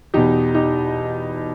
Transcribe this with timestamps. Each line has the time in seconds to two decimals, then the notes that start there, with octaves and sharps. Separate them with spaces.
0.14 E2 B2 D#4 G4
0.55 D#4 G4